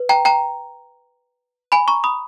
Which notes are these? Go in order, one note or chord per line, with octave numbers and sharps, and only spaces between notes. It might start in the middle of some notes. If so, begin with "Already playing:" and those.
Already playing: B4
G5 A#5
G5 A#5
G#5 B5
A#5 C#6
B5 D#6